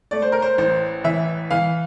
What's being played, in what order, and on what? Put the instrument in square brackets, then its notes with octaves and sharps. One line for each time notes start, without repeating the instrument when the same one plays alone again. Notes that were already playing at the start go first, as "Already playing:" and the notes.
[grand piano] A3 D5
C5
A#4
C5
A1 C5
E3 E5
E3 F5